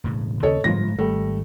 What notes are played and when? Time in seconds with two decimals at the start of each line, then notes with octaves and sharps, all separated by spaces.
0.04 E1 A2 C#3
0.43 D#2 C#3 C#4 A4 C#5 D#5
0.64 G1 G#2 F3 G#3 A3 A#6
0.99 G#1 G3 A3